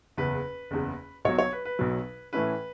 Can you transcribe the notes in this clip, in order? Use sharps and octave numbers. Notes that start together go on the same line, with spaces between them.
F#1 E2 C#3 B4
F#1 E2 C#3
B1 B2 F#3 C#5
C#5
B4
B4
B1 B2 F#3
A2 E3 A3 C#4 E4 B4